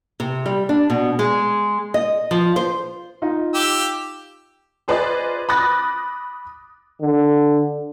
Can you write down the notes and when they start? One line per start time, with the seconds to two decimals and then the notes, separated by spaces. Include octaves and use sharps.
0.20 C3
0.46 G3
0.69 D4
0.90 B2
1.19 G#3
1.94 D#5
2.31 F3
2.56 C5
3.22 D#4 F4
3.54 G4 E6
4.88 F4 G#4 B4 C5 D5 D#5
5.49 B5 D6 D#6 F#6 A6 A#6
7.01 D3